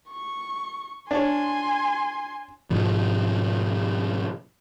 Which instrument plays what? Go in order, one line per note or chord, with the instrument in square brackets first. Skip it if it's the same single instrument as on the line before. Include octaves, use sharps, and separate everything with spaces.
[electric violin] C#6
[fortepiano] D4 C#5 [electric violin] G#5 C6
[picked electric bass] G#2 B2 F3